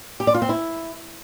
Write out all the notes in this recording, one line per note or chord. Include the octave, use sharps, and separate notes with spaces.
G4
D5
F4
C4
E4